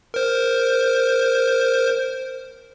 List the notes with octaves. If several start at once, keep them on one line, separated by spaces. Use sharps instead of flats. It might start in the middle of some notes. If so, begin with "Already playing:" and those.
A#4 C5